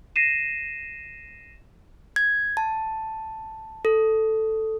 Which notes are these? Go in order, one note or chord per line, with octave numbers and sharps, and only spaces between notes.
A#6 C7 D#7 E7
G#6
A5
A4